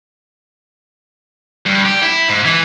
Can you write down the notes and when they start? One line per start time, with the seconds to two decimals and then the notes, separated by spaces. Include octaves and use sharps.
1.66 G2
1.85 G4
2.02 E4
2.29 G#2
2.45 E3